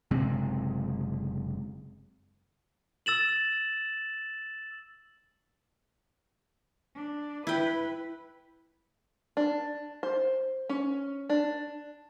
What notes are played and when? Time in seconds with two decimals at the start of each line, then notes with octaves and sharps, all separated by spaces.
0.11 F#1 C3 G#3 C4
3.06 E6 A6 E7 F#7
6.95 D4
7.47 E4 B4 G5
9.37 D4
10.03 C5
10.69 C#4
11.29 D4